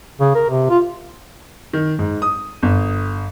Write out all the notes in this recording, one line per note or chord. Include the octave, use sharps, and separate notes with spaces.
C#3
A#4
C3
F4
D#3
G#2
D#6
G1